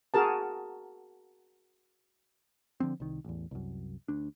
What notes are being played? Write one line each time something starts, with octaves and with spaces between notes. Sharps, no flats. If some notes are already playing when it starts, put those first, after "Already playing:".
F#4 G#4 A#4 A5
D3 F3 B3 C4
C2 D#3
A1 E2
C2 F#2
D2 D4